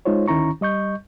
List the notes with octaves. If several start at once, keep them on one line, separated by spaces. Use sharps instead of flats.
G#3 D#4 F4 C5 C#5
D2 D#3 C#4 E4 A#5 C#6
G3 D#5 C#6 G6